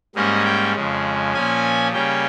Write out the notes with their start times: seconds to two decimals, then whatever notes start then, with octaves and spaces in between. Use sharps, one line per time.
0.15 G#2 G3 A#3 C#4 D#5
0.45 G5
0.75 F2 C#3 G#3
1.34 A#2 F3 A#3 C#4 G#5
1.93 C#3 G3 A#3 C#4 G5